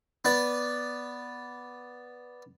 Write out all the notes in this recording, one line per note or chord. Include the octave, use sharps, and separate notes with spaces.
B3 B4 D5